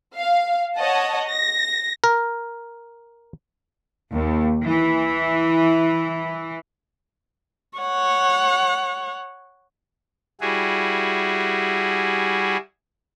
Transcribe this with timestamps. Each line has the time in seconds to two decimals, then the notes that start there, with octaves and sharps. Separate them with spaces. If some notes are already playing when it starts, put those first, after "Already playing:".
0.15 F5
0.77 C#5 D#5 F#5 A5
1.29 A#6
2.04 A#4
4.12 D#2
4.64 E3
7.78 C#5 F#5
10.41 G3 E4 F#4 G#4